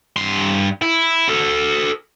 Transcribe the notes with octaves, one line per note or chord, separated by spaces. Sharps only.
G2 C6
E4
F#4 A4